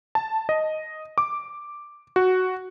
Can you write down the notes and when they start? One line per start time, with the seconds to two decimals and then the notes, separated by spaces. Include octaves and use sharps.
0.15 A5
0.49 D#5
1.18 D6
2.16 F#4